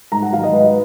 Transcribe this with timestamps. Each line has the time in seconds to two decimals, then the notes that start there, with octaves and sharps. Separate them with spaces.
0.12 G#2 A#5
0.22 F#5
0.32 D#3 F#3 F5
0.43 D#5
0.53 G#2 B4